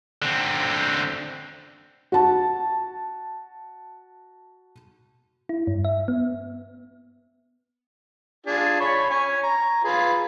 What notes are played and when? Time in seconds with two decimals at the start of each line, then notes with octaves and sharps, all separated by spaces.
0.22 D3 C4
2.12 F#4 A5
5.49 E4
5.67 G2
5.85 E5
6.08 B3
8.46 D4 F4 G#4
8.80 C#5 B5 C#6
9.10 C#5 G#5
9.43 A#5
9.84 F4 G#4 B4